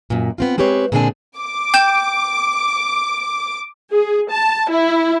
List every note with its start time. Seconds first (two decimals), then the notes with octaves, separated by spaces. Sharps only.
0.10 F#2 A#2
0.38 B3 C4 F4
0.58 G#3 C4 G4 B4 C#5
0.92 A#2 D3 G#3 C4 D4 G#5
1.38 D6
1.74 G5 G6 E7
3.92 G#4
4.30 A5
4.70 E4